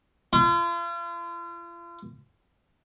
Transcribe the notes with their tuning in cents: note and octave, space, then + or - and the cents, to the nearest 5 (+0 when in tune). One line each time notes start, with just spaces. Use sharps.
F4 -40